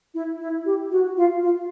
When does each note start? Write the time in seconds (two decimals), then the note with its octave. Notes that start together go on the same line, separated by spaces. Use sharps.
0.14 E4
0.40 E4
0.66 G4
0.91 F#4
1.17 F4
1.43 F4